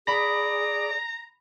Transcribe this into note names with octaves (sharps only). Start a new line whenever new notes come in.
G#4 D5 A#5 B5